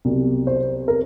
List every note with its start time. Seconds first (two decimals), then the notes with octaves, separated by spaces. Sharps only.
0.05 C2 B2 F#3
0.47 C5
0.88 A#4